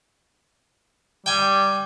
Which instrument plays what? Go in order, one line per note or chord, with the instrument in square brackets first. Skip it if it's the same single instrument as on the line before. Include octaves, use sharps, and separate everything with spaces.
[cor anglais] G3 [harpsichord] G5 G#5